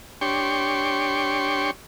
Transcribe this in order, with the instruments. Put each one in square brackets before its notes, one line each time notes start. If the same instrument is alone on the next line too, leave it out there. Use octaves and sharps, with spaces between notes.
[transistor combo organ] D4 G4 C#5 G5 C6 C#6